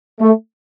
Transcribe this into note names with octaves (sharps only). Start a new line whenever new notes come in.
A3